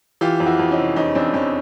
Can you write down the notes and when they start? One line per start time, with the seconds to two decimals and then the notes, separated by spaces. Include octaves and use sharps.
0.21 E3 F4 G4
0.40 F2
0.46 E4 F#4
0.59 F2
0.71 C#4 D#4
0.78 C3
0.96 E2 C#4 D#4
1.15 E2 C4 D4
1.34 E2 C#4 D#4